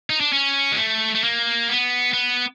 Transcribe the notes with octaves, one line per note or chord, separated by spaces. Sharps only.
D#4
D4
C#4
G#3
A3
A3
A#3
B3
B3